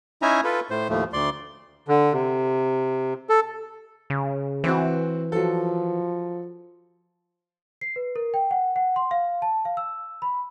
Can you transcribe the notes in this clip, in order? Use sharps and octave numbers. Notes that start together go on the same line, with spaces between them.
C#4 D#4 E4 E5 G#5 A#5
F4 A4 B4
A2 C5
D#2 A2 F3 A3
D2 D5 C6
D3
C3
A4
C#3
E3 C4 F#4
F3 F#3 A4
C7
B4
A#4
G5
F#5
F#5
C6
F5
A5
F5
E6
B5